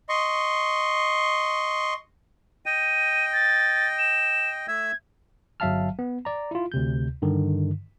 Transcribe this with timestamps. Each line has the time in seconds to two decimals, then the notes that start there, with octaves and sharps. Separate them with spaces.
0.09 D#5 C6 C#6
2.66 D#5 G5 D#7
3.33 A6
3.99 E7
4.68 A3 E5 E6 G#6
5.60 G1 F#3 E5 F5 A5 F6
5.99 B3
6.25 D5 A#5
6.51 E4 F4
6.72 D2 C3 G6
7.22 G2 D3 D#3